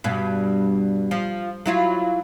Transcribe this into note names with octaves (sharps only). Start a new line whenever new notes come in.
G2 B2
F3
F#3 E4 F4